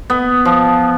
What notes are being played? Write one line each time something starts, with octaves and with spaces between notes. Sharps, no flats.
B3
F3